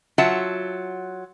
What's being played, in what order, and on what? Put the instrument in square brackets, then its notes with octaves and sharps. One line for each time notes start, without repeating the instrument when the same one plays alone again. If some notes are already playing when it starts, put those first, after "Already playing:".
[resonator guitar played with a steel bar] F#3 F4 E5 F#5 A5